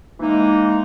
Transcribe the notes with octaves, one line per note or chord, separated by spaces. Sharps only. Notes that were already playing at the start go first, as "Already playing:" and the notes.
E3 G#3 A#3 D#4